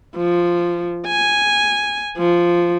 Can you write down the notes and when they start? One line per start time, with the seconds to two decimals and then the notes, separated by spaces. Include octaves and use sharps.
0.17 F3
1.08 G#5
2.18 F3